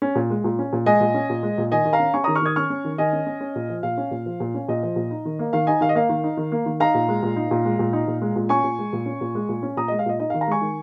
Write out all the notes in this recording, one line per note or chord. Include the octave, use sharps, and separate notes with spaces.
C#4
A#2
G#3
A#2
C#4
A#2
G#3 D#5 G#5
A#2
C#4
A#2
G#3
A#2
D#3 D#5 G#5
D#3
F5 A#5
C#4
C#4 G#5 C#6
D#3 A#5 D#6
C#6 F6
D#3 D#6 G#6
C#4 C#6 F6
C#4
D#3
D#3 D#5 G#5
C#4
C#4
C#4
A#2
F3
A#2 F5
C#4
A#2
F3
A#2
C#4
A#2 D#5
F3
A#2
D#4
D#3
A#3
D#3 F5
D#4 D#5 G#5
D#3 F5
D#5
A#3 F5
D#3
D#4
D#3
A#3
D#3
D#4 F5 A#5
A#2
G#3
A#2
D#4
A#2
G#3
A#2
D#4
A#2
G#3
A#2
C#4 G#5 C#6
A#2
G#3
A#2
C#4
A#2
G#3
A#2
C#4
A#2 A#5 D#6
G#3 D#5
F5
A#2 D#5
D#4 D#5
F5
D#3
F5 A#5
G#3 G#5 C#6
D#3